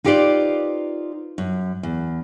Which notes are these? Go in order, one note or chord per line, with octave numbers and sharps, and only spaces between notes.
D#4 F4 G4 B4 C5 D5
F#2
E2